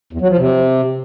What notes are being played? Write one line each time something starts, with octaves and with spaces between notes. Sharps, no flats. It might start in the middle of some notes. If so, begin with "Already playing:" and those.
E2
F#3
F3
C3